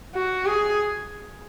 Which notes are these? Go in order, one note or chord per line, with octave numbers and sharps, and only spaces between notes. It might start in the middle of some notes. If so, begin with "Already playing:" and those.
F#4
G#4